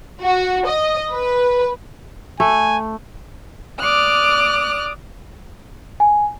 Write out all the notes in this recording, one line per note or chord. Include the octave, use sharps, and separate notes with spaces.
F#4
D#5
B4
A3 G#5
D5 D6 D#6 F6 F#6
G#5